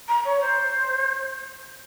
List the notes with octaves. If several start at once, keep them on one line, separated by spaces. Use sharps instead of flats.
A#5
C#5
C5